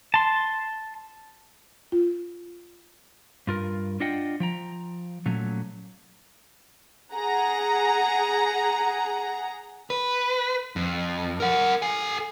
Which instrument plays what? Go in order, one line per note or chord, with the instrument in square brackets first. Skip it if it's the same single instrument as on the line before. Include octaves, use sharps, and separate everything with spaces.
[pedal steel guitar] A5 C6
[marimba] F4
[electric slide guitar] G2 F4 A#4
D4 F4 D#5 F#5 G5
F3 G5 A#5
A#2 F#3 A3 C#4
[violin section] G#4 F#5 A#5
[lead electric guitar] B4
F2
A#4 F#5
A4 G#5